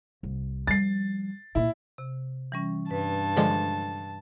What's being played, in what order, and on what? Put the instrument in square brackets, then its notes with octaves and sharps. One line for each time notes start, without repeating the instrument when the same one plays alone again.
[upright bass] C2
[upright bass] F3 G3 [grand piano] A6 C7
[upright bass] A#2 A#3 [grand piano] E4
[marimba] C3
E3 G3 C#4
[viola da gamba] G2 [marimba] B4 [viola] A5
[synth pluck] D3 F3 G#3